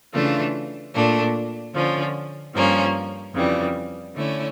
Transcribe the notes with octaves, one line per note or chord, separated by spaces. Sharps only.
C#3 E3 A3 D4 F4
A#2 A3 D4
D3 F3 C#4
G2 F3 A#3 C#4
F2 C#3 E3 G3
D3 A3 C#4 E4